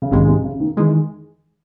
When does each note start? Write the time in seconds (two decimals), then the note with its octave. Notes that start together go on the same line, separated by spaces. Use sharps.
0.02 C#3
0.11 A#1 G#2 C3 D#3 G#3
0.27 C3
0.44 C#3
0.60 D#3
0.77 D#3 E3 G#3